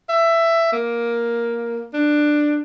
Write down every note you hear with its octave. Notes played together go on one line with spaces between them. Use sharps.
E5
A#3
D4